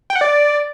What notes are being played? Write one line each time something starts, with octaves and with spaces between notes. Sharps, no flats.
G5
F#5
D5